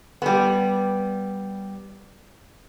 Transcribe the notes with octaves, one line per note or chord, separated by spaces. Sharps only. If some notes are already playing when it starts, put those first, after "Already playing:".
G3 B3